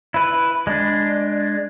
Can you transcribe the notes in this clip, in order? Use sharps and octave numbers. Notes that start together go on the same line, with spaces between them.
E4 B4
G#3 D4